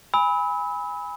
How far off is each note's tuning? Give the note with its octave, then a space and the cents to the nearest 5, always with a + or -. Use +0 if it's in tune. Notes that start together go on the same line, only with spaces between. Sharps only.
G#5 -20 B5 +0 E6 -35